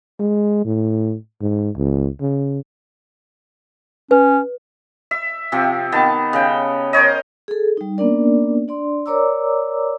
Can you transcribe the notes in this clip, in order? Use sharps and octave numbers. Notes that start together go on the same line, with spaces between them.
G#3
A2
G#2
C#2
C#3
C#4 B4
E5
C3 F3 C4
D#3 B3 A5
C#3 G5
A#4 C5 C#5 D#5
G#4 A4
G3 D#4
A#3 B3 C#4 D4 A#4 D5
D4 D5 C6
A#4 C#5 D5 A#5 D6 E6